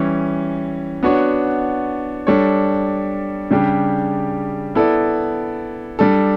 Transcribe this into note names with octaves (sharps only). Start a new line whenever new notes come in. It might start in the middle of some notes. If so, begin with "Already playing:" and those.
Already playing: E3 G3 C#4
B3 D4 F#4 C#5
G3 D4 A4 C#5
C#3 G3 D4 G4
B3 E4 A4 D5
G3 D4 A4